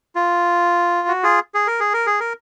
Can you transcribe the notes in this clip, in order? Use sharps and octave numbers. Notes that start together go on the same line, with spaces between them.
F4
F#4
F4 G#4
G#4
A#4
G#4
A#4
G#4
A#4